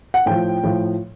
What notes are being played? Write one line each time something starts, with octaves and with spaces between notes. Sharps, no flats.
F#5
A2 F3 G5
A2 F3